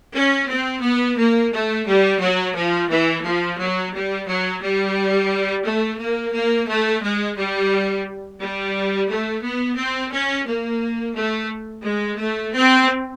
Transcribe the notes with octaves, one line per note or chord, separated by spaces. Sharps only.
C#4
C4
B3
A#3
A3
G3
F#3
F3
E3
F3
F#3
G3
F#3
G3
A3
A#3
A#3
A3
G#3
G3
G3
A3
B3
C4
C#4
A#3
A3
G#3
A3
C4